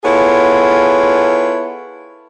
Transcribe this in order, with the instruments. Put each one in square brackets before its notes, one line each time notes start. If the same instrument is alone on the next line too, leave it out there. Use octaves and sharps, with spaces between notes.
[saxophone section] B3 E4 F4 G#4 A4 C#5